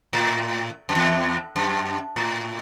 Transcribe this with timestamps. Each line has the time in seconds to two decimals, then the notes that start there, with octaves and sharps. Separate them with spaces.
0.13 A2
0.89 F#2
0.95 E2
1.56 F#2
2.16 A2